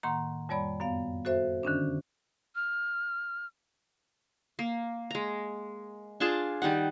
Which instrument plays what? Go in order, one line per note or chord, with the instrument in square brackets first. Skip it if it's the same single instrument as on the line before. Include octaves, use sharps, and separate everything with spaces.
[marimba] A2 D#3 A#3 F#5 A#5 C6
F2 G3 C#5 D5 B5
F#2 B3 F5
F#4 A4 C5 E5
D3 D#3 C#4 D4
[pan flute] F6
[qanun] A#3
G#3 A#5
D4 F4 G#4 A5
D#3 G3 D#4 F#5